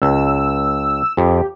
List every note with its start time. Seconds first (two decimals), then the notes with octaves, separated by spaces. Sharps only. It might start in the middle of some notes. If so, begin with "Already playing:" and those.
0.02 C#2 E6
1.17 F2 G4